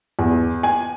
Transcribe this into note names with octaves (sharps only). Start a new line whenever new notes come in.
E2
G#5